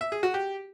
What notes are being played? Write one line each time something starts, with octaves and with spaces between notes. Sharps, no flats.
E5
G#4
F#4
G4